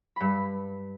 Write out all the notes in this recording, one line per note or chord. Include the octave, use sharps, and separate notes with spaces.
G2 B5